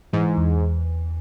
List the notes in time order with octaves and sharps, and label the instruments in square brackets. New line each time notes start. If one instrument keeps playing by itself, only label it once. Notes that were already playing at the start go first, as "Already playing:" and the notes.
[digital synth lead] G#2 [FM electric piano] E3
[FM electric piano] E2